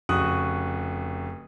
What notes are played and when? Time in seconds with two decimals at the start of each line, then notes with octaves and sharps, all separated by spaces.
0.09 F1 C#3 F#4 C#6 D#6 F#6